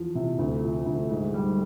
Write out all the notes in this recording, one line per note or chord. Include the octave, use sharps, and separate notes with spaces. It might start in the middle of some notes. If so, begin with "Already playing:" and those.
Already playing: E2 F3
C3
D2
F3
D2
G#2
G3